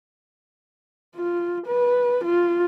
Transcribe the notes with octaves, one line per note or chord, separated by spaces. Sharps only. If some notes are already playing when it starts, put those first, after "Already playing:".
F4
B4
F4